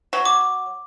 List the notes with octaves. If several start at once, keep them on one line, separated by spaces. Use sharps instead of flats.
F#3
D6